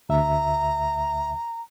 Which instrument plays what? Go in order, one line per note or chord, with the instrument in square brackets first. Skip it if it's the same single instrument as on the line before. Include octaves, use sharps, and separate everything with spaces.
[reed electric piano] D2 E5 [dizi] A#5